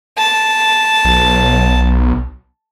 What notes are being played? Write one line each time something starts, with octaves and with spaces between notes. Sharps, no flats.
A5
B1